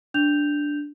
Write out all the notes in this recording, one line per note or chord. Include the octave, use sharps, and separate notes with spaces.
D4 G6 F7